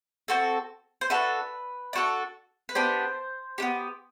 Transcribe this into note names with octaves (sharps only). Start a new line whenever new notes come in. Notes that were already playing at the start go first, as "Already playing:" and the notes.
C4 F#4 A4
C5
D4 F#4 A4 B4
D4 F#4 A4
B4
B3 D4 G4 C5
B3 D4 G4